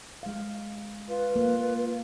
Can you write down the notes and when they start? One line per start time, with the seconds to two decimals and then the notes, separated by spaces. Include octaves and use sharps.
0.23 G#3 F5
1.08 F4 B4
1.36 A#3